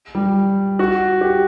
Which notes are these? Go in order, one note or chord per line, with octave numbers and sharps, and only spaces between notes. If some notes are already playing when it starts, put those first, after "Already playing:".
G3
F#4
G4